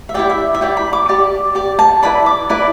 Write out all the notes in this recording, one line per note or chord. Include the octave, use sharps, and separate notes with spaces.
E5
E4 G4 D5 G5
E5
E5
E4 G4 D5 G5
B5
D6
G4 D5
G4 D5
A5
E4 B4 D5 B5
D6
E4 B4 D5